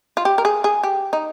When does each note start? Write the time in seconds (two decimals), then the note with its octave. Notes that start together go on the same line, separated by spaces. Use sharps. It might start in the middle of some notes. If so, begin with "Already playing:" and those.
0.17 F4
0.25 G4
0.38 A#4
0.45 G#4
0.64 G#4
0.83 G4
1.13 D#4